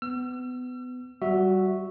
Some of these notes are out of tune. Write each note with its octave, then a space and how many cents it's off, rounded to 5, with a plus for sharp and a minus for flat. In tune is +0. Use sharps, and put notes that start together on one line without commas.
B3 +25 E6 +45
G3 -25 F#4 +0 E5 -10